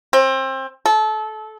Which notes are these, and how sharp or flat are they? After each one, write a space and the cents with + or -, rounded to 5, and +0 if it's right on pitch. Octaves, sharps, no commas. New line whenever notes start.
C4 +25
A4 -25